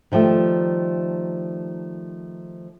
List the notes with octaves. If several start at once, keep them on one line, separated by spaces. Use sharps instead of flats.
D#3 F3 G3 A3